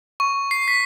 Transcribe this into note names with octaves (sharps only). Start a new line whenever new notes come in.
C#6
C7
B6